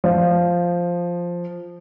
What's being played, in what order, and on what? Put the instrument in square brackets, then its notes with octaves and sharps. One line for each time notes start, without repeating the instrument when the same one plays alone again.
[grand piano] F3